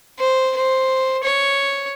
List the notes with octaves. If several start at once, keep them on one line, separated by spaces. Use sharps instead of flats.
C5
C5
C#5